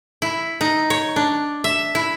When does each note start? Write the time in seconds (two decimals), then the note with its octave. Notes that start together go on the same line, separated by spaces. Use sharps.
0.22 E4
0.61 D#4
0.90 C#5
1.16 D4
1.64 E5
1.95 E4